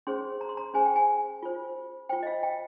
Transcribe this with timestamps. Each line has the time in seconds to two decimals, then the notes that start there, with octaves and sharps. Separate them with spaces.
0.07 C#4 G#4 C5 C6
0.41 A#5
0.49 C6
0.57 A#5
0.74 C#4 G#4 C5 G#5
0.85 G5
0.96 G#5
1.43 F4 C5
2.09 F4 C5 G5
2.23 D#5
2.27 F5
2.43 G5